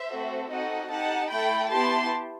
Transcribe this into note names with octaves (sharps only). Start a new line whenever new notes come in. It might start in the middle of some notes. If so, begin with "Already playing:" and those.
Already playing: C5 E5
A3 C4 F#4 A4
C4 D#4 F#4 A4 D#5 F#5
D#4 G4 F#5 A5
A3 E4 A4 G5 B5
B3 E4 G4 A5 C6